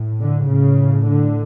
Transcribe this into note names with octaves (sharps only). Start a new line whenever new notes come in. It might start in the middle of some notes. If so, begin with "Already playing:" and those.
Already playing: A2
D3
A2 C#3
D3